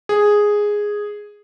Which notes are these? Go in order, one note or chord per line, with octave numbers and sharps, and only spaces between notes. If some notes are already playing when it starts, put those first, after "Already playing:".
G#4